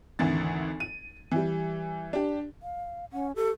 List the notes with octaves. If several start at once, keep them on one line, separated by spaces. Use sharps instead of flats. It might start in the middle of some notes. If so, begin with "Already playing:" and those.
G#1 D2 E3 A6
D#7
E3 G3
D4 G4
F5
C#4 F#5
G4 A4